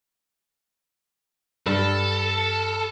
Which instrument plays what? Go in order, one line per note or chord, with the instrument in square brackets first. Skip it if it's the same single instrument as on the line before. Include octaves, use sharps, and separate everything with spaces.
[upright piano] G2 [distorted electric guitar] A4